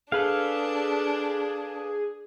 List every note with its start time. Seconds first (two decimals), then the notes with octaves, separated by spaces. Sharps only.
0.12 D4 G#4 A4 B4 F5